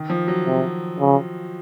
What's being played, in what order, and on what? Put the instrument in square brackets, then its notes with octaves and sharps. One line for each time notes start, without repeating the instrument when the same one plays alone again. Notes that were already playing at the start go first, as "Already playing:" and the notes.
Already playing: [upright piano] D#3
F3
F#3
[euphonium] C3
C#3